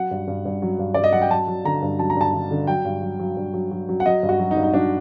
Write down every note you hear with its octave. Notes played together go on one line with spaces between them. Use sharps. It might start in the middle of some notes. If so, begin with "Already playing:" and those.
Already playing: F#3 F#5
G2
G2
G2
F#3
G2
G2 D5
D#5
F#3 F#5
G5
F#3 A5
F#3
D3 A#5
G2
F#3 A5
A#5
G2 A5
D3
D3
F#3 G5
G2
F#3
F#3
G2
F#3
F#3
F#3
F#5
F#3 D#5
G2
F#4
F#3
D#4
G2
D#4
F#3 D4